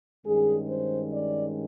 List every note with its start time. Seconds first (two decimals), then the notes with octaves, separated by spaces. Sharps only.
0.25 G2 D#3 G#3 C#4 G#4
0.69 C5
1.13 D5